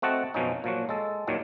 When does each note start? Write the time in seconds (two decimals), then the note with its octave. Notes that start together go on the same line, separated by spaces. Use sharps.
0.02 A3 C4 F#4 D#5 F#5 A5
0.34 F#2 B2 F3 C#4 D#4
0.64 A#2 F3 F#3 F#4
0.89 G#3 A4
1.27 D#2 A#2 D#3 F#3